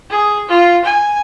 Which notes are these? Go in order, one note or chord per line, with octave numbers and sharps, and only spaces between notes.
G#4
F4
G#5